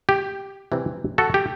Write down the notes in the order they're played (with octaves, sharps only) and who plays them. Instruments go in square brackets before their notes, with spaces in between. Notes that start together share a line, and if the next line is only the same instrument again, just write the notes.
[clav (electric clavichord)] G4
C3 E3 G3 C4
F#4 A4
G4